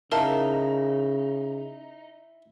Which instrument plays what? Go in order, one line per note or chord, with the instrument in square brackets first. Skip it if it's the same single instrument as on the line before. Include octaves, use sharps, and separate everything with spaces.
[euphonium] C#3 [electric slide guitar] D#4 [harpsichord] E4 [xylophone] A#4 F5 A5